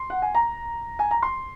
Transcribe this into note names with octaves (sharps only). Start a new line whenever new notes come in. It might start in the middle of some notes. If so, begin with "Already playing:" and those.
Already playing: C6
F#5
G#5
A#5
G#5
A#5
C6